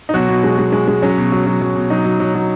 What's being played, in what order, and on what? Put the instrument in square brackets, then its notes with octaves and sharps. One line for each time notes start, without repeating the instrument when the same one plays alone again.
[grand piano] D#4
B2 F#3 F#4
B2
G#3
G#3
G#3
G#3
F#3 C#4
B2
F#3
F#3
F#3
B2
F#3 D#4
F#3
F#3
F#3